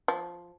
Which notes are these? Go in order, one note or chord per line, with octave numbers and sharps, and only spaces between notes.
F3